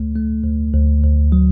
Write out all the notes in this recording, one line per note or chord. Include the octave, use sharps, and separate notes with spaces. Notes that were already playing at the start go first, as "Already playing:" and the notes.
Already playing: D2 A3
A3
D2
D2
D2
F#3